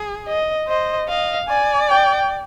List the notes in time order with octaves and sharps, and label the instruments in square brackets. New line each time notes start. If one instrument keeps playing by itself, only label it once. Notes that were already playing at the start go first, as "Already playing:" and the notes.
Already playing: [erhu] G#4
[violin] D#5
[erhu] C5 [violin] D#5
[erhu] D#5 [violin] F5
[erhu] D5 [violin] G#5
[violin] G5